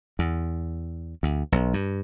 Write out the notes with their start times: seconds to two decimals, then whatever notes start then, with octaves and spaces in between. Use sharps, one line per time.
0.19 E2
1.23 D2
1.52 B1
1.73 G2